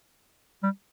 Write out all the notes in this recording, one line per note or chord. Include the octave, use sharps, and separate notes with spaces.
G3